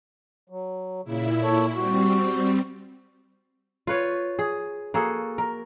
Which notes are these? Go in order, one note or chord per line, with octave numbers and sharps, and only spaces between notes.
F#3
A#2 C#3 E4
A4 C#5
G3 C4 F#4
F4 B4 C#5
G#4
A#3 F#4 G#4 A4
A#4